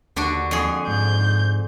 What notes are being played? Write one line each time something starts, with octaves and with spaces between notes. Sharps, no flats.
D#2 D3 D4 F#4
F2 G#4
G#2 G6